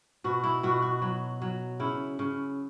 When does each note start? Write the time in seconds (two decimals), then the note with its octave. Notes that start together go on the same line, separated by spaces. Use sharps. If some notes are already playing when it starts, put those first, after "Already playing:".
0.24 B2 F#4
0.44 E4
0.63 B2 F#4
0.82 F#4
1.02 F#3
1.42 F#3
1.80 C#3 E4
2.19 C#3